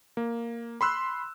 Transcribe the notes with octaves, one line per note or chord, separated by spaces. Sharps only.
A#3
B5 C6 E6 F#6